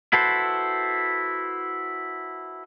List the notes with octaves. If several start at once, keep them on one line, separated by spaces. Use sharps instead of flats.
E4 F#4 A4 B4 C5